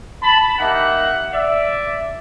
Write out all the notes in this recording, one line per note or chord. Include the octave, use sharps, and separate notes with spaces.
A5 B5
A#3 D#4 G4 E5 F#5
D5 E5